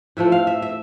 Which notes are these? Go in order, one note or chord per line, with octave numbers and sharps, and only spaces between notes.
A2 F3 A3 E5
F5
E5
E5